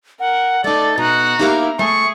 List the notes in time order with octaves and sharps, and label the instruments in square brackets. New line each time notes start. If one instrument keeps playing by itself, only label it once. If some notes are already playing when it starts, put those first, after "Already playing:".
[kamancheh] A#4 [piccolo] F#5
[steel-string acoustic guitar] A3 D#4 [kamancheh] A4 [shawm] D5 [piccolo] A6
[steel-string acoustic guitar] B2 [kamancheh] D#4 F#6 [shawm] F#4 [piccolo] A#5
[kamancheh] A#3 E4 [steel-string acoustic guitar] D#4 G4 F5
[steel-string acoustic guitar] A3 [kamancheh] G#4 [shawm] C#6